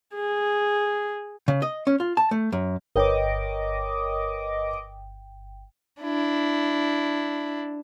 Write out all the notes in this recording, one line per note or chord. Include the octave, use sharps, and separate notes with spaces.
G#4
C#3
D#5
C#4
F4
A5
A3
F#2
G1 A#4 B4 C#5 D#5 G5 D6
D4 E4